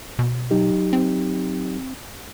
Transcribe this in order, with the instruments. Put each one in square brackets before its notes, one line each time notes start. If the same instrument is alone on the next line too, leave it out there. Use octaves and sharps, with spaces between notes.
[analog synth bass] B2
[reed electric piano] F#3 D#4 G4
[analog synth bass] C4